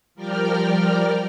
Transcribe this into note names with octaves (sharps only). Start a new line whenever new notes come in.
F3 G3 A#4 D5 G5 F6